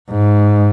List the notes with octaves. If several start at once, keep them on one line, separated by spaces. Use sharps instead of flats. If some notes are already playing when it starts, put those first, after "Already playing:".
G#2